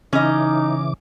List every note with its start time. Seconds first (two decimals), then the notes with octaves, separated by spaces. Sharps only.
0.13 C#3 E3 C#4 D#4 D#5 D6